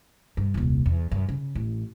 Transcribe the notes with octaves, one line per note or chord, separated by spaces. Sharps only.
G2
D#1 C2
E2
F#2
C#3
A1